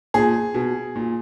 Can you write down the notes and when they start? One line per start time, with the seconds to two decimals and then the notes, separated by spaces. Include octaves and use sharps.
0.14 A#2 G#4
0.54 B2
0.95 A#2